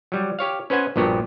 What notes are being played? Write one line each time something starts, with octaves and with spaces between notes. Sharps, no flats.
F#3 G3
G4 C#5 F5
C#4 B4 C5 F#5 G#5
A#1 G2 A#2 B3 F#4 G4